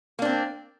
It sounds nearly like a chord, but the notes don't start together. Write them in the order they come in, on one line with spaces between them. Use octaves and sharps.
A#3 D4 C4